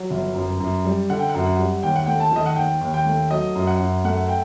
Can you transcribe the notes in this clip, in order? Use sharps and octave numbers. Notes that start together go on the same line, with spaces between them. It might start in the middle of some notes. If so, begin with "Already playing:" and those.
Already playing: F#3
G1
F#2
F#2
G3
D3 F#5
G5
F#5
F#2
F#5
G3
D#2 G5
F#5
A3 G5
A5
D#3 D#5
F#5
D#2 G5
D#2
G5
A3
F#3 D#5
F#2
F#5
F#2
A3 F#5
G5